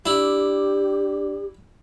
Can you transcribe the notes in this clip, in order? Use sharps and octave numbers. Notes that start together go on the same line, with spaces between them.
D4 E4 G4 D5